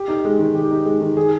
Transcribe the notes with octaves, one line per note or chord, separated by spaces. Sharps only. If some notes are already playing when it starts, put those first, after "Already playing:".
Already playing: G4
D#4
G#3
D#3
G4
D#4
G#3
D#3
G#4